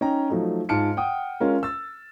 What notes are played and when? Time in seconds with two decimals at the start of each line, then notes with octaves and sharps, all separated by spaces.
0.01 C#4 D#4 G5 A#5
0.30 F3 F#3 A3 D#4
0.69 G#2 F4 A5 F6 C#7 D7
0.97 F#5 G5 D#6
1.40 G#3 C#4 F4 A#4
1.63 E6 A6